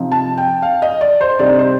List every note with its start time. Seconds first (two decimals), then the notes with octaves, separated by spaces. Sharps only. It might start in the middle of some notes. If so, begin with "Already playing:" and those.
Already playing: C3 F3 C4 D#4
0.12 A5
0.37 G5
0.62 F5
0.82 D#5
1.01 D5
1.21 C5
1.39 C3 G3 C4 D#4 D5
1.59 C5